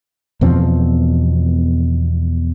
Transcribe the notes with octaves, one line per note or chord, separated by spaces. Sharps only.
E2 B2 F3 C4